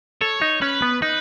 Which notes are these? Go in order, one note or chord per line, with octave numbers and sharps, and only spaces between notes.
A4 C#5
D#4
C#4 B4
B3
D#4 B4